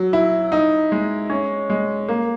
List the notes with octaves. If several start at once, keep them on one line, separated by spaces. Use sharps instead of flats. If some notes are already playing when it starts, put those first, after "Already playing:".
Already playing: F#3
E4
D#4
G#3
C#4
G#3
A#3